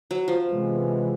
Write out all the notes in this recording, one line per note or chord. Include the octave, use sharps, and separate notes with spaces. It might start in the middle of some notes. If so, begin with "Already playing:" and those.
F#3
F3
C3 E3 G#3 B3